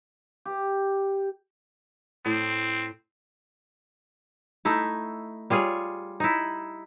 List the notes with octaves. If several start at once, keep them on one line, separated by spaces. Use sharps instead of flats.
G4
A2 C4
A3 D#4 E4
G3 F4 G#4 C#5
D#4 E4